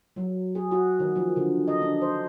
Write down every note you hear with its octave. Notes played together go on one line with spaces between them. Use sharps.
F#3
G#4
F#4
D#3
F3
D3
D#5
D4
C5